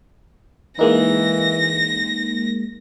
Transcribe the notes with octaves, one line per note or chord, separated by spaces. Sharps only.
E3 G#3 A#3 D#4 A#6